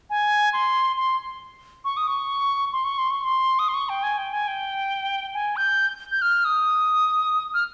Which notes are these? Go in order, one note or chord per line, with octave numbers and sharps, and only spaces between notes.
G#5
C6
C6
C#6
D#6
C#6
C6
C#6
C6
C#6
C6
D#6
C6
C#6
G5
G#5
G5
G#5
G5
G#5
G6
G6
F6
D#6
F6